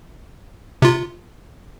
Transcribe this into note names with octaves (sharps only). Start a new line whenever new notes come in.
C3 F4